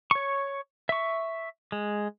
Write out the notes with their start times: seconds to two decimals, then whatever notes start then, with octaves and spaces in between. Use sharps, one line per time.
0.11 C#5 C#6
0.89 E5 C#6
1.72 G#3